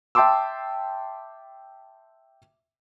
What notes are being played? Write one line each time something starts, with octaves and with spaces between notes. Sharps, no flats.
E5 G5 A5 C6 D6 E6